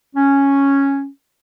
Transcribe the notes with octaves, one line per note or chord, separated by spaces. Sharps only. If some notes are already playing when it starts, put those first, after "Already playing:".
C#4